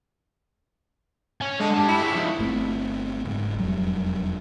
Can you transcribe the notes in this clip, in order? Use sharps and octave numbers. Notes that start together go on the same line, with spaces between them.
C#5 G#5
D3 G#3 D#5
G4 A5
E4
G#3 C#5
F3 D#4
G1 A3 B3 C4
F#1 G#2
E1 F2 F#3 G3